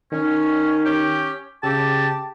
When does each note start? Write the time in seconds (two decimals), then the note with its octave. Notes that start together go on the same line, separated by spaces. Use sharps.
0.12 D#3 C#4
0.84 C#4 G4
1.64 C#3 G4 A5